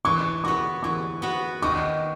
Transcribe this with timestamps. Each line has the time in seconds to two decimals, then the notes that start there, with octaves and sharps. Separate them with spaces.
0.05 E3 C#6
0.44 B3 F#4 C#6
0.83 E3 C#6
1.22 B3 F#4
1.62 D#3 C#6